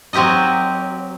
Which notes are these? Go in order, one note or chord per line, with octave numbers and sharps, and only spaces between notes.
F#3 C4 G4 A#4 D#5